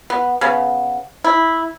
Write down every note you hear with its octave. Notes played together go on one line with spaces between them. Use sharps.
B3
C#3 B3
E4